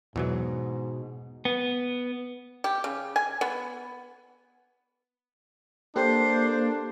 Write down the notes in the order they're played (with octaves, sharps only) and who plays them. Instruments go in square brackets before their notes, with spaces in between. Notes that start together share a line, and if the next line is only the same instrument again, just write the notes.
[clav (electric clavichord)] E2 E3 F#3 [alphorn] G#2 [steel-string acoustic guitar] B2
[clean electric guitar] B3
[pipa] G4
C#3
G#5
B3
[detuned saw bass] A#3 [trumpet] D4 [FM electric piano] G4 A4 [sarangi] C5